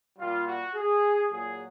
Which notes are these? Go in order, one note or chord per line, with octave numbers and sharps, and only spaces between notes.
A#2 G3 F4
F#4
G#4
A#2 F#3 G#4